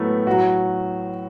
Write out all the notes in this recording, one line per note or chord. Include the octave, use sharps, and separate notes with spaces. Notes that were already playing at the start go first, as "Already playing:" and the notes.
Already playing: A2 F#3 A3 B3
A2 F#3 F#4